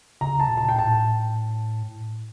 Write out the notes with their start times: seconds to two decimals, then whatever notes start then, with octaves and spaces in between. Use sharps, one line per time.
0.21 C#3 A#5
0.40 A5
0.48 A#2
0.57 A5
0.69 G5
0.76 A2 A5